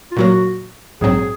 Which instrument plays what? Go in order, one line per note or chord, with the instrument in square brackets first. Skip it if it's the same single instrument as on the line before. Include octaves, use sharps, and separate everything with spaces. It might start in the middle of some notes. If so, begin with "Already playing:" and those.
[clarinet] F4
[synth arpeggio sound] A#2 F#3 A#3 [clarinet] F#4
[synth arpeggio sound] A#1 G#2 F#3 C4 [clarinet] G#4